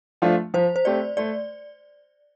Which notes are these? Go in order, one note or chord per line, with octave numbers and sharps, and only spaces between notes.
F3 A3 D4 F4
F3 C5
C5
A3 C4 G4 D5
A3 D5